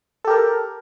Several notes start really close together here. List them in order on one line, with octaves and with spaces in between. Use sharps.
A4 G4 A#4